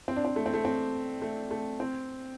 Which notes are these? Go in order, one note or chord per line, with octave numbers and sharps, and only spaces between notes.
C4
D4
C4
A3
C4
A3
C4
A3
A3
C4